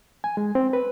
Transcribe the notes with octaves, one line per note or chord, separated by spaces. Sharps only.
G#5
G#3
C4
B4